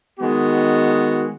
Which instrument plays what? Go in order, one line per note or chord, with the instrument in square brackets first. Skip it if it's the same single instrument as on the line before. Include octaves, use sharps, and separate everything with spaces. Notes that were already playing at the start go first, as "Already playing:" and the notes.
[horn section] D#3 G#3 B3 F#4